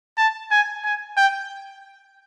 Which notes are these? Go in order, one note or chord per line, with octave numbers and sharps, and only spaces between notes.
A5
G#5
G#5
G5